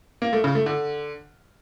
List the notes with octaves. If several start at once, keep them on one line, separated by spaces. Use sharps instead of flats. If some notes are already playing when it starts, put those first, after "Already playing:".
A#3
A3
C#3
A3
D3